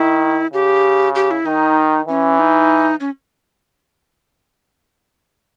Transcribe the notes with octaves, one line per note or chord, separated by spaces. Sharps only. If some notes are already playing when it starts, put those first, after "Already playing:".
Already playing: D#3 E4
C#3 G4
G4
E4
D#3 D#4
E3 C#4
D#4
C#4